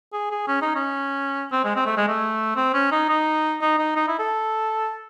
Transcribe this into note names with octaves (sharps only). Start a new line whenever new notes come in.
G#4
G#4
C#4
D#4
C#4
C4
G#3
C4
A3
G#3
A3
C4
C#4
D#4
D#4
D#4
D#4
D#4
E4
A4